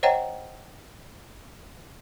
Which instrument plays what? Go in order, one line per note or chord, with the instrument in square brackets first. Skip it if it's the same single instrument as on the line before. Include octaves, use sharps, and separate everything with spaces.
[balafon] C5 C#5 D#5 F#5 G5 A#5